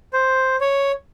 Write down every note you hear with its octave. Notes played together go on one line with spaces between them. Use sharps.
C5
C#5